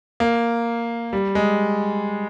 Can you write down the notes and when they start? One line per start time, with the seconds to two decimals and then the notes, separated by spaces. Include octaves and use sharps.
0.20 A#3
1.13 G3
1.35 G#3